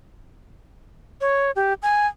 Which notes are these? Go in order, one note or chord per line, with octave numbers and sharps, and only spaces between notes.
C#5
G4
G#5